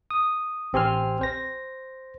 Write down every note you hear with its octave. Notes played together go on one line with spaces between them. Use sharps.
D#6
A1 C4 G4 G#5 C6 F6
C5 A#6